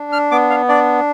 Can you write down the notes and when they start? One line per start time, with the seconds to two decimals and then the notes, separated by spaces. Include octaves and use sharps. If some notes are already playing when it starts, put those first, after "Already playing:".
Already playing: D4
0.12 F6
0.31 B3 D6
0.50 F5
0.69 D4 D5